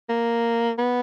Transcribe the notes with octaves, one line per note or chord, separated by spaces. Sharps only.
A#3
B3